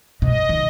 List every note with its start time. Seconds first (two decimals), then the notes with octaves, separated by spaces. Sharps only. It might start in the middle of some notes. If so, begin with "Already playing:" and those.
0.22 B2 D#5
0.49 D#3